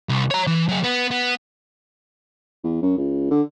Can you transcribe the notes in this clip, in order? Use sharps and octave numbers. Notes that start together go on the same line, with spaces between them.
C2
C#5 A#5
E3
F#3 G#4
B3
B3
E2
F#2
C#2
D3